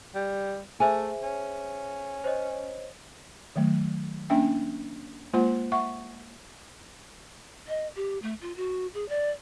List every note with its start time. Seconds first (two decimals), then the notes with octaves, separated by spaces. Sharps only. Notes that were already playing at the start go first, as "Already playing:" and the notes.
0.15 G3
0.80 A3 G#4 C5 E5 G#5
1.23 C#4
2.24 C5 C#5 D#5
3.56 D#3 F#3 A3
4.30 A#3 C#4 D4 E5 G5
5.33 G#3 A#3 F4 C5 F#5 C6
5.72 E5 F#5 C#6
7.68 D#5
7.96 G4
8.22 A3
8.41 F4
8.56 F#4
8.94 G#4
9.09 D5